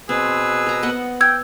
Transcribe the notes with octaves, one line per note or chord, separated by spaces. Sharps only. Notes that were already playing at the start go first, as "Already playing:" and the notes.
B2 C4 G#4 B4 E6
A#4 A#5
B3 D#5 F#5
G5 E6 G#6